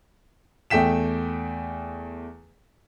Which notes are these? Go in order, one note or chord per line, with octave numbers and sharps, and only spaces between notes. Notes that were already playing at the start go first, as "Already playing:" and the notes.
E2 A3 G5 B6 E7